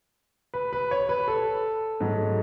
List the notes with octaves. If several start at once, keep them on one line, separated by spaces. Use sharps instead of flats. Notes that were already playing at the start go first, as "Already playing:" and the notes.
B4
B4
C#5
B4
A4
G#2 F#3 A3